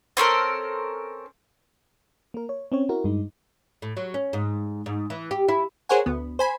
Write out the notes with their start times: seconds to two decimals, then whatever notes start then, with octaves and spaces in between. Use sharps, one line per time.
0.17 C4 C#4 A4 A#4
2.34 A#3 A#4
2.49 C#5
2.72 C4 C#4 C#5
2.89 E4 F#4 A#4
3.04 G2 G#3 D#4
3.82 A2
3.97 F#3
4.14 C#4
4.33 G#2
4.86 G#2
5.10 E3
5.31 G4
5.49 E4
5.89 G#4 A#4 C5 C#5 F#5 G#5
6.06 D2 B3
6.39 C5 G#5 B5